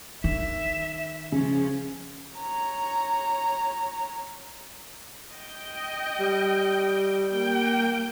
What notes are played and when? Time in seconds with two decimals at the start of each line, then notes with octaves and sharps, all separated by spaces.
0.24 D#3 E5
1.32 C#3 F3 C#4
2.39 C#5 A#5
5.35 D#5 G5
6.20 G3
7.29 A#3 G5